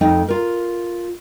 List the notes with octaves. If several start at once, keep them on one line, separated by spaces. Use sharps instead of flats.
F2 A3 D#4 G5
F4 A#4